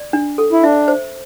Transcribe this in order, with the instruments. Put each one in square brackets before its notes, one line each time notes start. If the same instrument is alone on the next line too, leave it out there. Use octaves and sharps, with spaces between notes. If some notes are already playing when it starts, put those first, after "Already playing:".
Already playing: [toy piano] D5
D4
A4
[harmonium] E4
[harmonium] D4 [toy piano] E5
[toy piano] C5